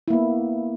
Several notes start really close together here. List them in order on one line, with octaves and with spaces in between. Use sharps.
E4 A#3 B3